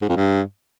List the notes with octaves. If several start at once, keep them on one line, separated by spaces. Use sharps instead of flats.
G#2
F2
G2